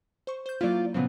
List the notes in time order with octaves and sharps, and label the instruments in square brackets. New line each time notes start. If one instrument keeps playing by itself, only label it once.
[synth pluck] C5 C#6
C5 G6
[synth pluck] F#3 A#3 E4 [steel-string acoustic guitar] F4 D5
[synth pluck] A#2 F#3 C4 [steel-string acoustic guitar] C#3 F3 B3